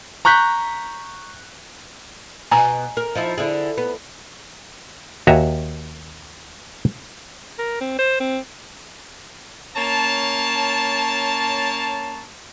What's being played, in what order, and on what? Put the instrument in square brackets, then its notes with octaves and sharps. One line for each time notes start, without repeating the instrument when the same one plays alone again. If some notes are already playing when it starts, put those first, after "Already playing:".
[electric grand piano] A#5 C#6 F#6 G6 B6
[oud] B2 [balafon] G#5 A#5
[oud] A#4
F3 D#4 E4
D3 E4 G#4
B3
[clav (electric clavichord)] D#2 F#4 E5 G#5 A#5
[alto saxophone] A#4
C4
C5
C4
[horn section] A#3 C#4 C#5 A5